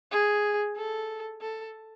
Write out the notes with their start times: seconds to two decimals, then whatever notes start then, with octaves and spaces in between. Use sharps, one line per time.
0.11 G#4
0.76 A4
1.41 A4